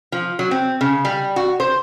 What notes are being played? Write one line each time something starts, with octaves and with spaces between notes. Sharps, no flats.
F3
F#3
C4
C#3
G3
F#4
C5